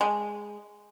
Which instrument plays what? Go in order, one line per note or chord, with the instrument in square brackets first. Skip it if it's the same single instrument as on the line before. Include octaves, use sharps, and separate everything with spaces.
[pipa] G#3